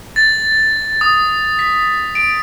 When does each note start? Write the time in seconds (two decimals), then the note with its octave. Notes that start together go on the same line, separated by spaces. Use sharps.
0.16 A6
1.01 D#6
1.59 B6
2.15 D7